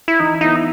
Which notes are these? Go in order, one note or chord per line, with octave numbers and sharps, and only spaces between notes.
E4
E3 D#4
B3 D#4 E4